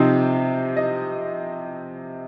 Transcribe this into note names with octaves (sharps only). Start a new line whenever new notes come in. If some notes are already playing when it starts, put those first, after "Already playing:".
Already playing: C3 F3 C4 D#4
D#5